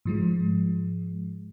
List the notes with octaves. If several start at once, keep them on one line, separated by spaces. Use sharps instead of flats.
G#2 F3 G#3